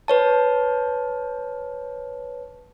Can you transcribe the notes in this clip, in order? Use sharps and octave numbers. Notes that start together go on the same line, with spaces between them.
B4 C#5 A5